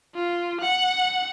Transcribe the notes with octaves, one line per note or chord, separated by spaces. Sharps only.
F4
F#5